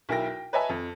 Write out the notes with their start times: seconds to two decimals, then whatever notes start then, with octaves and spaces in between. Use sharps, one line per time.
0.09 B1 E4 A#4 G5 A#6
0.26 G5
0.53 B4 C#5 D#5 E5 G#5 A5
0.69 F2